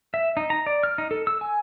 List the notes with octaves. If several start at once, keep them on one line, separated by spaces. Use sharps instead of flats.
E5
D#4
A#5
D5
F6
D#4
A4
E6
G#5